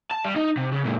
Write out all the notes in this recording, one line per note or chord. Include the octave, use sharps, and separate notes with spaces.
A5
G3
D#4
C3
C#3
A#2 G#3